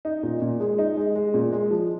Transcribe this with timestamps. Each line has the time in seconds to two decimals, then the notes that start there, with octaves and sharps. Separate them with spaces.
0.05 D#4
0.23 A#2
0.42 A#2
0.60 G#3
0.78 D#4
0.97 G#3
1.15 G#3
1.34 A#2
1.52 G#3
1.71 F3